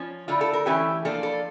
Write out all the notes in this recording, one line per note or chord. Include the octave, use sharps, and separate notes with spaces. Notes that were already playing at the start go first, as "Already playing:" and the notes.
Already playing: F3 C#4
D3 A3 E4 F4
A4
A#4
E3 A3 C#4 E4 G4
F3 A#3 D4 A4
A4